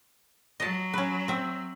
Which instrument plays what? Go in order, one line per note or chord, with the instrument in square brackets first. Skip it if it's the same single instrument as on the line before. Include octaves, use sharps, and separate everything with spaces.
[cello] F#3 [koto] D#5 A5
[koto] C#4 B4
C4 E5